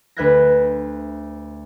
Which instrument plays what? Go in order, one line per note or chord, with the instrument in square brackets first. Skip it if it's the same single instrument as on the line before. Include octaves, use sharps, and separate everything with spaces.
[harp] D2 B4 E5 F#6 G#6 A#6